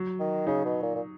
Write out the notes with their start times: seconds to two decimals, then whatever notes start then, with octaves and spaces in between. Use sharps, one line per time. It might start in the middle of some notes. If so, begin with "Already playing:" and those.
Already playing: F#3
0.20 D#3
0.47 C#3 D#4
0.65 B2
0.82 A#2
0.95 A#2